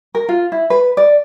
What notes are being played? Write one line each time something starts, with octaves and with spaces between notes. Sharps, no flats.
A#4
F4
E4
B4
D5